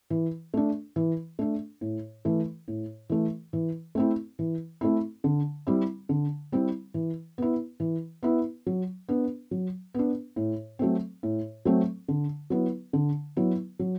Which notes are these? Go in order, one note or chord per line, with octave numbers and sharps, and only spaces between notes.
E3
A3 D4
E3
A3 D4
A2
E3 A3
A2
E3 A3
E3
A3 C4 E4
E3
A3 C4 E4
D3
G3 C4 E4
D3
G3 C4 E4
E3
B3 E4
E3
B3 E4
F#3
B3 D4
F#3
B3 D4
A2
F#3 A3 C4
A2
F#3 A3 C4
D3
F#3 B3 E4
D3
F#3 B3 E4
F#3